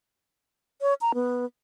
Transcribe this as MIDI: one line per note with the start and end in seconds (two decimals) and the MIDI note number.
0.81 0.94 73
1.01 1.12 82
1.14 1.45 59